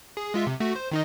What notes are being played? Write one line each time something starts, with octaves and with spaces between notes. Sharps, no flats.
G#4
G#3 F4 E5
C3
A3 F#4
C5
D#3 D#4 D#5